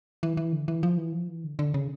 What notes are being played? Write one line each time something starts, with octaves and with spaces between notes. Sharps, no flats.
E3
E3
D3
E3
F3
E3
F3
E3
D3
D3
C#3